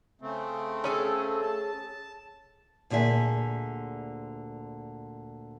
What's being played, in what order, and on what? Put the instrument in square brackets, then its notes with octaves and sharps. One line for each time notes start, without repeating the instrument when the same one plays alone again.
[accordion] C#3 A3 C4
[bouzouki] C#4 G#4 A4
[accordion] A5
[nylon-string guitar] D2 A#2 D3 G#4 E5